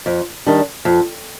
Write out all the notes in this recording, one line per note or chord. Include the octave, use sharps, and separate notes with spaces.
F2
D#3 G3 D4
F2